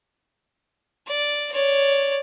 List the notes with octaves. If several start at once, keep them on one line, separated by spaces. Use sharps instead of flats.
D5
C#5 D5